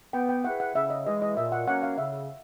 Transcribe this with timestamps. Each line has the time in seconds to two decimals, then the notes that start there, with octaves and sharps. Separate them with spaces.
0.13 B3 G5
0.29 G5
0.44 E4 G#4 B4 F#5
0.60 F#5
0.75 C#3 E5
0.90 D#5
1.06 E3 G#3 D#5
1.22 D#5
1.37 A#2 E5
1.52 F#5
1.67 F#3 A#3 C#4 F#5
1.83 F5
1.98 C#3 E5